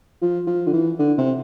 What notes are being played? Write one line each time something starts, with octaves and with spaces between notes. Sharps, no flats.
F3
F3
D3
E3
D3
C3